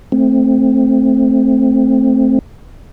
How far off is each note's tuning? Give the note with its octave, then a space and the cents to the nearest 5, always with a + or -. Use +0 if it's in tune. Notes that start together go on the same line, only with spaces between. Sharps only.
A3 +0 C4 +5